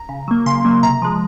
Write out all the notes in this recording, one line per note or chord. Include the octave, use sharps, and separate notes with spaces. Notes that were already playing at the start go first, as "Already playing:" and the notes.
Already playing: A#5
C#3
F#3 A#3
C#3 C6
F#3 A#3
C3 A#5
F3 G#3